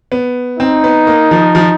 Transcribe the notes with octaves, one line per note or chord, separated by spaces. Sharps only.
B3
C4 D#4
B3
A#3
F3
F3